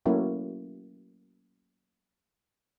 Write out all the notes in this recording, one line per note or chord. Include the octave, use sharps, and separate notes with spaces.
F#3 A3 A#3 C#4 E4 F#4